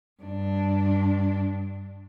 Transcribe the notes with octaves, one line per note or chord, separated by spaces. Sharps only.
G2 D4